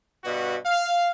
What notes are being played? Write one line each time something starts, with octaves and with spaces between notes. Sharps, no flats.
G2 B2 F#4
F5